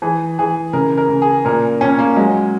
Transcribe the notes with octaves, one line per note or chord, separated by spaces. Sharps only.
E3 G#4
E3 G#4
C#3 A#4
A#4
C#3
G#4
A#2 A#4
A#2 C#4
A#3
F#3 G#3